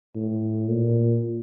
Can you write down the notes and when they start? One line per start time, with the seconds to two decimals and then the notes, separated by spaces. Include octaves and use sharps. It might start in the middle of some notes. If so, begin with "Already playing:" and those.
0.16 A2
0.68 A#2